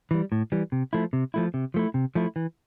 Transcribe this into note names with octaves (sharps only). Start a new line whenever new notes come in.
E3 G3
A2
E3 G3
C3
F3 A3 E4
C3
F3 A3 E4
C3
F3 A3 E4
C3
F3 A3 E4
E3